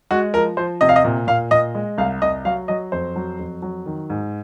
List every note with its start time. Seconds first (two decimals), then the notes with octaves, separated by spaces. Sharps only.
0.11 G#3 F#4
0.34 F3 A#4
0.57 F3 C5
0.81 C3 D#5
0.89 F5
0.96 D#5
1.04 A#2
1.27 A#2 F5
1.51 A#2 D#5
1.75 G#3
1.98 C2 F5
2.22 C2 D#5
2.45 F#3 F5
2.68 F#3 D#5
2.92 F2 C5
3.16 F#3
3.39 F2
3.62 F#3
3.86 D#3
4.10 G#2